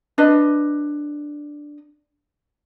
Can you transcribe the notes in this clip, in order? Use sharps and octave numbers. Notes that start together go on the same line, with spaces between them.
D4 B4 D#5